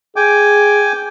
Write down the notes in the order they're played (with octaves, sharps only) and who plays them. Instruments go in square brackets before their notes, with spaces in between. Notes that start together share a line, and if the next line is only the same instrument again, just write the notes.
[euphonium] G#4 [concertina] G5 G#5 D6